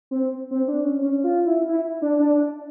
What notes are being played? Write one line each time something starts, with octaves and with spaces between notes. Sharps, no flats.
C4
C4
D4
C#4
C#4
F4
E4
E4
D4
D4